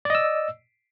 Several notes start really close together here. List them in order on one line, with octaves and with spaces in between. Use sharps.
D5 D#5 E6